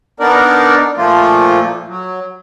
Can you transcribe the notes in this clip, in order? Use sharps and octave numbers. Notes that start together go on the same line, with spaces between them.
B3 D4 D#4 A#4 D5
A#2 F3 A3 A#3 F4
F#3